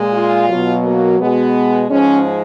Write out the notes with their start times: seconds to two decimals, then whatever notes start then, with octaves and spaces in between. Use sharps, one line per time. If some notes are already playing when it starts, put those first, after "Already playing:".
Already playing: A#2 G#3
0.13 F4
0.49 B2 F#3
0.83 A#3
1.19 B2 G#3 B3
1.90 G#2 F3 G#3 C#4